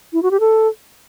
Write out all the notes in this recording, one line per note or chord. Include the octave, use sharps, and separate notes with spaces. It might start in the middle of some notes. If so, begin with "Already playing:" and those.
E4
F#4
G4
A4